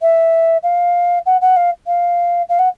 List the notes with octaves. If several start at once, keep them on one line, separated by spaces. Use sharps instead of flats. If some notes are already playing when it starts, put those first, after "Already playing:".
E5
F5
F#5
F#5
F5
F5
F5
F#5